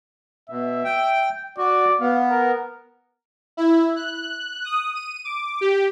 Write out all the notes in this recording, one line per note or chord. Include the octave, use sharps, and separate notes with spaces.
B2 E5
G5
F#4 D5
B3 F5
A#4
E4
F#6
D#6
D#7
D6
G4